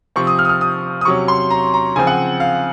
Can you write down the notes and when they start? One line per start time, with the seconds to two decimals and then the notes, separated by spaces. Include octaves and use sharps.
0.16 C3 F3 C4 C#6
0.27 D#6
0.39 F6
0.45 D#6
0.49 F6
0.61 D#6
1.01 D#6
1.05 C3 F#3 C#4 C#6
1.28 C6
1.50 A#5
1.74 A#5
1.96 C#3 F3 C4 G#5
2.07 F#5
2.40 F5